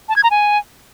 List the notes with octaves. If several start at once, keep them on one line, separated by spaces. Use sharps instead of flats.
A5
G#6
A#5
G#5